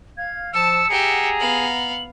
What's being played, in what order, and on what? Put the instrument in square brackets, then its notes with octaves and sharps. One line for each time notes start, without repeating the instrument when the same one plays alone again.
[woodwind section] F5 [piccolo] G#6
[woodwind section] F3 [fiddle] A5 [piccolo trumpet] E6 [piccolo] C#7
[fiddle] G4 E5 [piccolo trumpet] G#4 [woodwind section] F#5 A#5
[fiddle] B3 F5 [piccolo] F#7